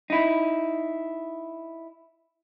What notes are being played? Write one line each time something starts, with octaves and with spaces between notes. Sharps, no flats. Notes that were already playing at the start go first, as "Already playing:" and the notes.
D#4 E4